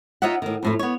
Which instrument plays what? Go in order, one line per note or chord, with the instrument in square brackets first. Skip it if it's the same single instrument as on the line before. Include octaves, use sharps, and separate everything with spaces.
[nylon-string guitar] D#4 F4 C#5 D#5 E5 F#5
A2 D#3
F2 A2 A3
B3 C#5